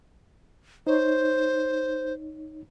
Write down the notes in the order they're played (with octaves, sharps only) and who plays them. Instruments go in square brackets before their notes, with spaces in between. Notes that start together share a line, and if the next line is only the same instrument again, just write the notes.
[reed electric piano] D#4 C#5 [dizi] C5